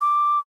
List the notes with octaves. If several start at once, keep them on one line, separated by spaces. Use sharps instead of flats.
D6